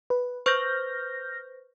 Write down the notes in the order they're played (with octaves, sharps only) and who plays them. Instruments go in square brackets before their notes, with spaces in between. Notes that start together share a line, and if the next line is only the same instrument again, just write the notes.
[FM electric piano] B4
[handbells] B4 C5 C#6 [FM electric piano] F6 G6 A#6